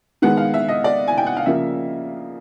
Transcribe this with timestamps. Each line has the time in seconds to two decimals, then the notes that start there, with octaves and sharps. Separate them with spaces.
0.22 D#3 G#3 B3 F#5
0.37 F5
0.54 E5
0.69 D#5
0.84 D5
1.08 G#5
1.18 G5
1.26 F#5
1.37 F5
1.46 C#3 F3 A#3 E5